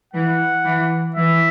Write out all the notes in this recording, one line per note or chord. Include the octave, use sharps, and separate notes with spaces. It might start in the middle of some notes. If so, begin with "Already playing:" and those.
E3 F#5
E3
E3 E5